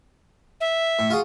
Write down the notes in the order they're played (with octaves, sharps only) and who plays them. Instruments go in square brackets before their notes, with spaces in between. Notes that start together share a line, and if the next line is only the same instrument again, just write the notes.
[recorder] E5
[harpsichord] A2
F4 F#4 G#4